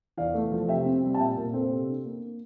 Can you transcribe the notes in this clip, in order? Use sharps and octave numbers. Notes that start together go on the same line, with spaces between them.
E2 D5 F5
A3
F3
C3 E5 G5
C4
G3
A5
A#2 E5 G5
A#2 A#4
C4 A4 C5
C3
D4
A#3